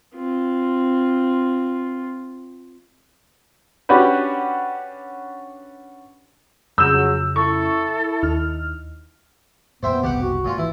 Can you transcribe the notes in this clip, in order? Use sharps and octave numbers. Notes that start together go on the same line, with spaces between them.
C4 F4
C#4 D4 F#4 G4 B4
F2 C#3 F#3 G#4 E6 G6 E7
E4 A4 C#6
D#2 D#4 F6
F2 A#2 B3 C5 E5 G5
F#1 C2 G4 F#5 D6
F#4
G#1 A#2 F4
E3 E4